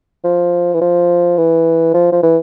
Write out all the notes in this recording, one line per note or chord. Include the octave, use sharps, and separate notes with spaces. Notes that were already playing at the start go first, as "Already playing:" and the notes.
F3
E3
F3
E3
F3
F3
E3